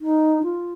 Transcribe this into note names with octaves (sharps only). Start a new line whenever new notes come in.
D#4
F4